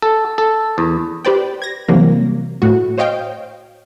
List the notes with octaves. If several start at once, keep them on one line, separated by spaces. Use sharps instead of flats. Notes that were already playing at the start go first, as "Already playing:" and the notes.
A4
A4
E2
G4 B4 C5 D5 G5
G#6 A#6
C3 E3 F#3 G3 A#3
A2 F#4
C5 C#5 D#5 F5 G5